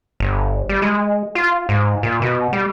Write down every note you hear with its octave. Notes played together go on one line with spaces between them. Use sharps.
G1
G3
G#3
F4
G#2
A#2
B2
G3